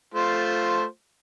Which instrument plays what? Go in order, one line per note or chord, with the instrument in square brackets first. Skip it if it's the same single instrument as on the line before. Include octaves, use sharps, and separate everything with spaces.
[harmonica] A3 F4 C5